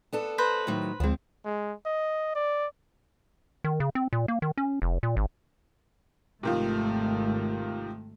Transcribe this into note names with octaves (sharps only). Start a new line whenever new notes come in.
B3 D4 A4
B4 C5 A#5
A2 D#3 F#3
D2 F3 G#3 C4
G#3
D#5
D5
D#3
C#3
C4
A#2
A#3
D#3
C#4
F1
A#2
G#1
G#1 C3 D#3 F3 A3